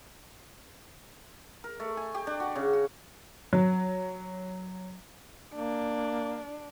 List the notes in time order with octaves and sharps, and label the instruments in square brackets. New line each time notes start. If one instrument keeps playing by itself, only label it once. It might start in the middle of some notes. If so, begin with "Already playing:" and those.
[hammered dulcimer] A#4
A3
G#5
G4
D4
F#4
C#3
F#4
[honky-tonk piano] F#3
[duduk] A#3 [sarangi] D4